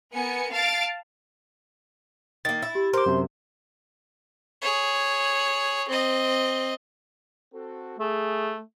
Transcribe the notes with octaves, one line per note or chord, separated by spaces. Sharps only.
B3 A#4 G#5 C#7
F5 A5 A6 D7
D#3 A#3 A6
E4
G4
A#4 C5 D6
F#2 C3
G#4 C#5
C4 D#5
C4 F#4 A4
A3 G#4